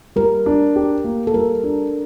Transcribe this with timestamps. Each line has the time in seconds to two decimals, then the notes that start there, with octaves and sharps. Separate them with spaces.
0.16 G3 A#4
0.46 D4
0.76 G4
1.04 A#3
1.27 A4
1.34 G3 A#4
1.63 D4